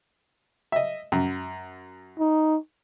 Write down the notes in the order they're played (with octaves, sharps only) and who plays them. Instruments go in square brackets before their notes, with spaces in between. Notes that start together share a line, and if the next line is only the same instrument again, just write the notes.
[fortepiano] D#5 E5
F#2
[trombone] D#4